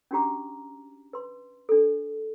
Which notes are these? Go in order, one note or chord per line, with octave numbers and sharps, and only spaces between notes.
C#4 D4 F#4 G4 A#5 D6
B4 C6
D4 A4